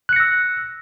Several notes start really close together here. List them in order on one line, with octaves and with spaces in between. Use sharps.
F#6 C#7 A#6 E6